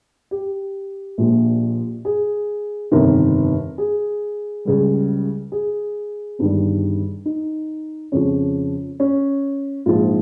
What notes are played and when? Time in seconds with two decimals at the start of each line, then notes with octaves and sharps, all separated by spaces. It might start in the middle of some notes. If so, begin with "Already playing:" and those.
0.31 G4
1.18 A#1 A#2 F3
2.05 G#4
2.92 G1 F2 C3 D#3 A#4
3.78 G#4
4.65 C#2 C#3 G3
5.52 G#4
6.39 G1 G2 D#3 G3
7.25 D#4
8.12 F2 C#3 F3 C#4
9.00 C#4
9.86 A#1 G#2 F3 F4